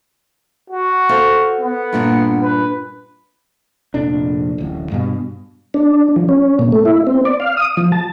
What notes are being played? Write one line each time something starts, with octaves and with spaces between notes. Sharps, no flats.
F#4
A4 C5 F5
B3
G2 A#2 D4
B4
F1 A#1 F2 D4
D1 A1
G2 B2
D4
F3
C#4
A#2
A3
E4
C4
D5
F5
D#6
F3
A5